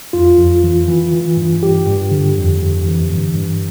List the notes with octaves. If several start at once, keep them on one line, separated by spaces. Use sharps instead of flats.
F2 F4
F2
E3
E3
E3
G2
G2 G4
G2
D3
F2
F2
E3
G2
G2